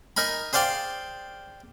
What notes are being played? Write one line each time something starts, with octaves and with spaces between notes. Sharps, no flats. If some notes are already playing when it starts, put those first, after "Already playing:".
D#4 A#4 G#5 B5
G#4 C5 D5 F5 G5